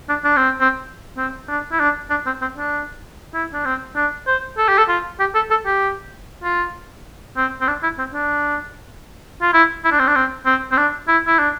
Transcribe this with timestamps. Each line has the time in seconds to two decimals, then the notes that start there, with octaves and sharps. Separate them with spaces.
0.09 D4
0.24 D4
0.37 C4
0.61 C4
1.17 C4
1.48 D4
1.72 E4
1.80 D4
2.10 D4
2.26 C4
2.41 C4
2.57 D4
3.34 E4
3.54 D4
3.65 C4
3.96 D4
4.27 C5
4.58 A4
4.68 G4
4.78 A4
4.89 F4
5.20 G4
5.35 A4
5.51 A4
5.66 G4
6.44 F4
7.37 C4
7.61 C4
7.68 D4
7.83 E4
7.99 C4
8.14 D4
9.42 F4
9.54 E4
9.84 E4
9.92 D4
9.99 C4
10.07 D4
10.15 C4
10.46 C4
10.71 C4
10.77 D4
11.08 E4
11.27 E4
11.39 D4